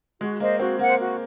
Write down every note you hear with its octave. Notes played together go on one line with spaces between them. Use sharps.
G#3 F#4
A#3 C5 D#5
C4 F#4
A#3 C5 F#5
F#4